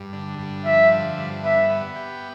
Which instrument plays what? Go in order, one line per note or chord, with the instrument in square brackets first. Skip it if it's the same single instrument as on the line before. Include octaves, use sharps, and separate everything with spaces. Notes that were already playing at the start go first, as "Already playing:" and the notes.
Already playing: [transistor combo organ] G2
D3
G2
[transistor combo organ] F3 [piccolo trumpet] E5
[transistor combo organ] D3
G2
[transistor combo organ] B3 [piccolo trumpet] E5
[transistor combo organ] B3
G4